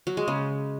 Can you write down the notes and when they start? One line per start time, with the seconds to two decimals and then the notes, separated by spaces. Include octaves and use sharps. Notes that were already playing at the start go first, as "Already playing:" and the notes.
0.07 F#3
0.17 G#3
0.28 C#3